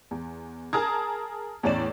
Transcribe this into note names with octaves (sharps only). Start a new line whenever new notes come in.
E2
G#4 A#4 A5 A#5 D#6 G#6
E2 A2 C#4 D5 E7